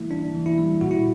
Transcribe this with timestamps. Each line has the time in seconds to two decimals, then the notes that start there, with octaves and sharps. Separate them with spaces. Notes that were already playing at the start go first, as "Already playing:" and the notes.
Already playing: E3 G3 A#3 E4
0.11 D4
0.34 E3
0.46 E4
0.58 G3
0.81 A#2 F#4
0.91 E4